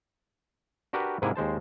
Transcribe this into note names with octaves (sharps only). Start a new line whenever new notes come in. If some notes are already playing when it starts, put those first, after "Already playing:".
D4 F#4 G4 A#4 B4
G#2 C3 A#3 E4 G#4 G#5
D#2 G#3 C5 A5